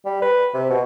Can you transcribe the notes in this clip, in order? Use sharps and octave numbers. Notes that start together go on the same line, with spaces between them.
G3
B4
C3
B2